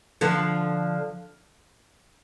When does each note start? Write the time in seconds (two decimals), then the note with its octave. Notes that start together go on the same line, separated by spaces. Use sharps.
0.21 D3 F3